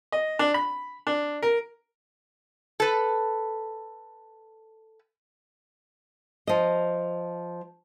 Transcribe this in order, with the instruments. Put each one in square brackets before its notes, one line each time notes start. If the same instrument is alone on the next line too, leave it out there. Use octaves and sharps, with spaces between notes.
[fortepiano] D#5
D4
B5
D4
A#4
[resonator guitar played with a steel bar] A4 B4
[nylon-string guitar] F3 D#5